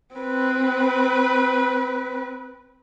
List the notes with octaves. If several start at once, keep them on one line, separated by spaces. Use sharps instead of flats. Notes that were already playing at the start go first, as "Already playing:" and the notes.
C4 B4